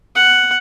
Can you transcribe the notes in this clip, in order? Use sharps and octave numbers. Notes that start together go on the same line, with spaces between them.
F#5